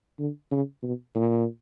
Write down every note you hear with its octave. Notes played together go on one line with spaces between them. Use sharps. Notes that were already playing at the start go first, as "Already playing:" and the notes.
D3
C#3
B2
A#2